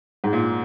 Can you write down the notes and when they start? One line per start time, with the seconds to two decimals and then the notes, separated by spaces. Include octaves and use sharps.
0.24 G#2
0.33 A#2